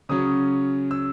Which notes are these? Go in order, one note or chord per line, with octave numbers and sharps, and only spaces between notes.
C#3 F#3 C#4 D#6
E6